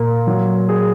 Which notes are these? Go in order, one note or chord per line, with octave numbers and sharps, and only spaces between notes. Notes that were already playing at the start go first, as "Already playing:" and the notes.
Already playing: A#2 A#3
F#3
G#4